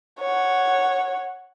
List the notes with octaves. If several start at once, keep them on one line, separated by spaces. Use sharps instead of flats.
C#5 F#5